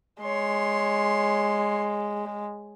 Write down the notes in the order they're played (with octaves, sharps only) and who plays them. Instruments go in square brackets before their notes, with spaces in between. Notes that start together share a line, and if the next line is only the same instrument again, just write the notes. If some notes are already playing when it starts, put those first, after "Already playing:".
[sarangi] G#3 [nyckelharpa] C#5 C6